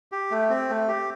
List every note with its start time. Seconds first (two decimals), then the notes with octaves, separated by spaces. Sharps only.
0.12 G4
0.31 A3
0.50 C4
0.69 A3
0.88 G4